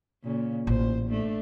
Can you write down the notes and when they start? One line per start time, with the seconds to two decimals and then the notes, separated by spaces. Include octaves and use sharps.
0.24 A#2 C#3
0.67 A1 A#2 C5
1.10 A3 D4